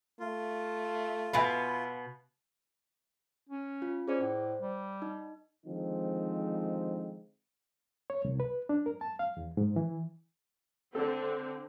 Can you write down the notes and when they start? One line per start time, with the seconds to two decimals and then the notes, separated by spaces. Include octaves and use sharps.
0.20 A3 F4
1.33 B2 B3 E5 F5 G#5 B5
3.49 C#4
3.82 F4
4.08 C#4 G#4 C5 D5
4.21 A2 C5
4.60 G3
5.02 D#4
5.67 D3 D#3 F3 G#3 C4 D#4
8.10 C#5
8.25 C2
8.40 B4
8.69 D4
8.86 A#4
9.01 A5
9.19 F5
9.37 E2
9.57 G#2
9.76 E3
10.95 D3 C4 A4